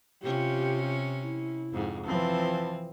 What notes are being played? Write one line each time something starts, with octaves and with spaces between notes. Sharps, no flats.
C3 C#4 F4 G4
E4
F2 G#2
E3 F3 C4 A5